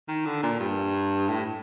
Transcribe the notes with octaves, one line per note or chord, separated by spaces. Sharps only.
D#3
D3
A#2
G2
A2